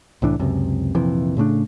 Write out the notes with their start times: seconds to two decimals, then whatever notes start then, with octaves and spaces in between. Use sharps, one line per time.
0.22 C2 A2 E3 D4
0.39 C#2 F#2 C3
0.95 A#1 F2 C3 E3
1.37 A2 C#3 A3 D4